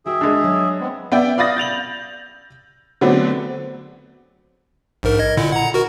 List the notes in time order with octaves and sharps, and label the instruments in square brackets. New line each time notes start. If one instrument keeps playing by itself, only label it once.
[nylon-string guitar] D#3 F#4 G5 [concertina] G#4 E5
[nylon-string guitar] D#3 [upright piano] G#3 D4
[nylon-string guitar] F#3
[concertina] G#3 B3 C4
[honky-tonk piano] B3 D5 E5 G5
D5 F5 B5 D#6 A6 A#6
G6 A6 F7 F#7
D3 F#3 A3 B3 C4 D4
[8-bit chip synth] A#1 G#2 A#4
D#5 G#6
A#2 D3 E4
F#5 A#5
F#4 A#4